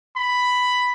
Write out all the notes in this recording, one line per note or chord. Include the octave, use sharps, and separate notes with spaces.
B5